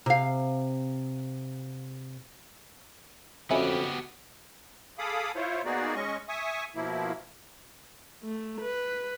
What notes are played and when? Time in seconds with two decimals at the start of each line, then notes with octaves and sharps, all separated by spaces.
0.06 C3 F5
3.51 F2 B3 C#4 E4 F#4 G4
4.99 G#4 A4 F5 B5 D6 D#6
5.36 E4 F4 C5 C#5
5.65 A#3 B3 D#4 F#4 G#4 D5
5.96 G#3 C#4 D#5 C#6
6.29 E5 G#5 C#6 D#6
6.75 B2 F3 A#3 E4
8.24 A3
8.61 B4